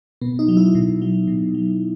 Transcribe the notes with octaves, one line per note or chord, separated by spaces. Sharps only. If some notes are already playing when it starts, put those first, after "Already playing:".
B2 B3
D#4
F#3
E4
B2
F#3
B2
F#3